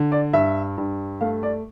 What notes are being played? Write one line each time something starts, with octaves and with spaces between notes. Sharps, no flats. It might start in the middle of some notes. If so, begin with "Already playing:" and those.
Already playing: D3
D5
G2 E5
G2
A3 F5
D5